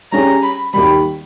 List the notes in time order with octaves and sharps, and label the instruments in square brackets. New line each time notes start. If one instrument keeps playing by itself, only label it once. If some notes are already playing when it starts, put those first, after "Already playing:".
[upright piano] G3 C#4 G#4 [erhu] A#5
[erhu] B5
[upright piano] D#2 D#3 G3 [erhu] B5